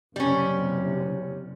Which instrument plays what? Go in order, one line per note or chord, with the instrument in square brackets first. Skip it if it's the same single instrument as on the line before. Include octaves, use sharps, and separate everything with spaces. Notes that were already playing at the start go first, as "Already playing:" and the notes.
[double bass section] F#1 C3 [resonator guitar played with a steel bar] G3 C#4